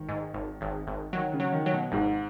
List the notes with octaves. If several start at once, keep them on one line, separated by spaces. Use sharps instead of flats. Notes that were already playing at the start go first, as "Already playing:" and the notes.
Already playing: G#1 D#3
G#2
G#1
G#1
G#1
D#3 F#3
C#3
F#3
D#3
F#3
B2
G#1 G#2